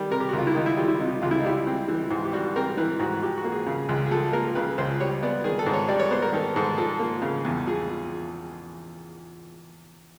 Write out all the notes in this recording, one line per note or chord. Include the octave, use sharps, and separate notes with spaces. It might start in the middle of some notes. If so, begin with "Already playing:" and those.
Already playing: D#3 G3
C3 A#4
G4
F#4
C#2 F4
E4
D#3 D#4
E4
G3 F4
E4
C3 D#4
C#2 F4
E4
D#4
G3 E4
C4
E3
G#2
G4
G3 F#4
C4 A#4
E3 B4
G#2 F#4
F3 G4
F#4
A#3
G#4
C#3
C#2
G#4
F3 A4
A#3 A#4
C#3 B4
C#2 C5
G3 C#5
B3 D5
D#3 G#4
A4
G#2
C#5
G3 D5
C#5
B3 C5
A#4
D#3 A4
G#2 A4
F3 A4
A#3
C#3
E2
F3 G#4